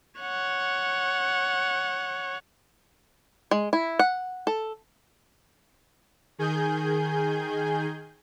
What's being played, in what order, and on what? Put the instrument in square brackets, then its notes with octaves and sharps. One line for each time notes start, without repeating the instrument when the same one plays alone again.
[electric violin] C#5 F#5
[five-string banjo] G#3
E4
F#5
A4
[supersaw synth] D#3 G#4 G#5 G6